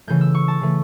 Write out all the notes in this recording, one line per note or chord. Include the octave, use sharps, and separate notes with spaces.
C#3 E3 A3 G6
E6
C#6
A5
C#3 E3 A3